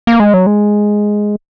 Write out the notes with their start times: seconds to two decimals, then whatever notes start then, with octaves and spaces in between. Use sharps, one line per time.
0.07 A#3
0.20 G#3
0.34 F#3
0.46 G#3